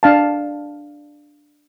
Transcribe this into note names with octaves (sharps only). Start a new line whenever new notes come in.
D4 F5 A5